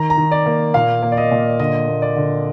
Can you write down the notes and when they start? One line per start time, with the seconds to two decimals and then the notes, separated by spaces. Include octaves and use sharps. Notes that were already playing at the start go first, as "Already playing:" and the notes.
Already playing: D#3 A#5
0.10 A#5
0.18 D#3
0.31 D5
0.46 A#3
0.74 A#2 F5
1.02 A#3
1.12 D5
1.17 D#5
1.31 A#2
1.60 D3 D#5
1.88 A#3
2.02 D5
2.16 D3